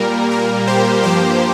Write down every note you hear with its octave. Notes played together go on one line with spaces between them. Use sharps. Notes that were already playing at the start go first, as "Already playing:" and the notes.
Already playing: A#2 G3 A#3 A#4
A#4
G4 C5
G2 F3 A#3 G4 C5